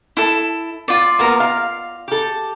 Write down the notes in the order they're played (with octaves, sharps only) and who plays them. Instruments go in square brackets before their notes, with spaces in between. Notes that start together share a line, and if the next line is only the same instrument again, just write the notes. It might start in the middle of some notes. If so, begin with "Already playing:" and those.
[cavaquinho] E4 A4
F4 D5
[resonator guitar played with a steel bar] A#3 B3 A#4
F5
G4 A4